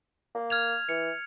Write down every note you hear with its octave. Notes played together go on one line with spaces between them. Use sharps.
A#3
F6 G#6 F7
E3 C#7